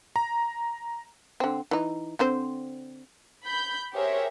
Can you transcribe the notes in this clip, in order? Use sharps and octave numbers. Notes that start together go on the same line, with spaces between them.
A#5
D3 C4
E3 D#4
D3 C4 C5
B5 G6
G4 G#4 A#4 C5 C#5 E5